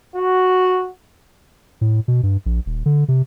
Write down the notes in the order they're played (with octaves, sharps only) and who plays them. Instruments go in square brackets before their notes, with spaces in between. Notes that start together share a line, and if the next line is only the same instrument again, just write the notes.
[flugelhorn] F#4
[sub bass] A2
B2
G2
A#1
D#1
D3
C3